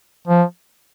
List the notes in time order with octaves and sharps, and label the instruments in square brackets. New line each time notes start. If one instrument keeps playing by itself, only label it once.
[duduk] F3